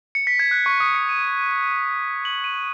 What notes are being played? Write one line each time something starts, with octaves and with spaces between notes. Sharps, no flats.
C#7
B6
G#6
F#6
C#6
D#6
C#7
D#7
F#7
D#7